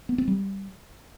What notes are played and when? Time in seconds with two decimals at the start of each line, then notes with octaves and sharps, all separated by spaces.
0.09 B3
0.18 C4
0.28 G3